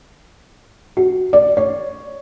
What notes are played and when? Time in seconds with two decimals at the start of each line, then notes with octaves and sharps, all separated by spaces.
0.97 F#4
1.33 D5
1.57 C#5